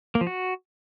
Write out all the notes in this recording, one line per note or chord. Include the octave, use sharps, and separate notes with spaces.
A#3
F3
F#4